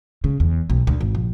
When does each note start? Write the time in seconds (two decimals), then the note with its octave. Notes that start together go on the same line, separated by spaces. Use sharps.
0.24 C#3
0.40 E2
0.70 B1
0.87 D2
1.01 G#1
1.15 A#1